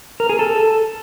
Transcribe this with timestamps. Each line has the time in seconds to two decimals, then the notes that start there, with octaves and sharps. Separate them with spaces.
0.20 A#4
0.29 G#4
0.39 A4